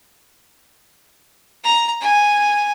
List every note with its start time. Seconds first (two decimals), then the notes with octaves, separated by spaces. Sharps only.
1.64 A#5
2.01 G#5